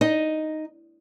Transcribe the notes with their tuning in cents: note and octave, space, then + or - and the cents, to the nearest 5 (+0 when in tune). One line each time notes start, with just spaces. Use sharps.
D#4 +0 D#5 +0